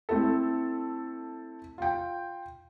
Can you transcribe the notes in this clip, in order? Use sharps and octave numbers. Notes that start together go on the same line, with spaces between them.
A3 C4 E4 A4
F4 G5